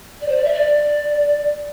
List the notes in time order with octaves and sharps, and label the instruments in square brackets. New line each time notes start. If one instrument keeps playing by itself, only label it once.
[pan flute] D5
C5
D5
E5
D5